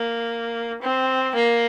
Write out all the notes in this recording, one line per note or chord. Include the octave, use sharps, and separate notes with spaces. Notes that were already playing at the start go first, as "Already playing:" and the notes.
Already playing: A#3
C4
A#3